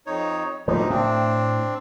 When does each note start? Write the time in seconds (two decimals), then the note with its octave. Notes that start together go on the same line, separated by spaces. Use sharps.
0.07 F2 D#4 C#5
0.67 D1 D2 G2 F3 A#3 D#4
0.90 A2 C4 D4